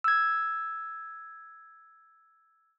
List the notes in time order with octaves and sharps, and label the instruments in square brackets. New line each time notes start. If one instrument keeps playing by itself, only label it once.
[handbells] E6 G#6